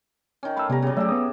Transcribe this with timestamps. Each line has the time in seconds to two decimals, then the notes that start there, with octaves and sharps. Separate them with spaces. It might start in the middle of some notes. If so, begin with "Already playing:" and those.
0.43 D#3 C#4
0.57 A3 F5 B5 E6
0.70 C3 G3 B3 G4 A#5
0.82 C#3 F#3
0.97 F#3 A3 G4 A4 D5 E5
1.09 B3 D#6